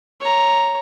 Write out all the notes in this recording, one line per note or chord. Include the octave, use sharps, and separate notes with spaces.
C#5 A#5